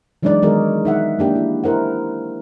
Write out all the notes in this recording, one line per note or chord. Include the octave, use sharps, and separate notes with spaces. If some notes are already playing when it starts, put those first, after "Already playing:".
E3 F#3 G#3 D4 D#4 D5
D#3 G#3 B3 F#4 G#4 A#4
D#4 E5 F#5
A#3 D4 G4
E4
E4 A#4 C5 F#5